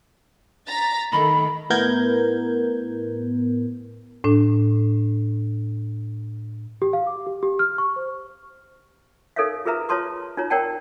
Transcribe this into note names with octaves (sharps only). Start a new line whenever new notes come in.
A#5 A6 B6
D#3 A3 B5
A2 B3 E4 A#4 G6 G#6
A2 D4
G4
F5
D6
G4
G4
F6
C#6
C5
D#4 A4 A#4 C#5 E5 F5
F4 G#4 A#4 B4 E5 A#5
F4 B4 C#5 A5 C6 D#6
D#4 F4 C#5 A#5
A#4 C#5 D5 F#5 G5 A5